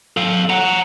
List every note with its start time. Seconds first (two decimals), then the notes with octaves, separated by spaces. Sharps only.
0.17 A4 F5
0.50 F#5 A#5